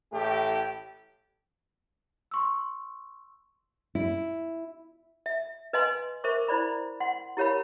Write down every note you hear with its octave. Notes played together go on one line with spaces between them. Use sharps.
A1 A2 A3 G4
C6 C#6 E6
E4
E5
B4 D#5 F5 G#5 C6
A#4 C5 E5 C#6 D6
E4 C5 D5 B5
F#5 C6
E4 G4 A#4 C#5 F5 B5